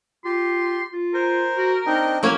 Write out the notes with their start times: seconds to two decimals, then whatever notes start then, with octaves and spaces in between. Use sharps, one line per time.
0.25 F4 G4 C6
0.93 F4
1.14 A#4 C5
1.57 F#4
1.86 C4 D4 D#4 D#5
2.23 F#3 A#3 C#4 E4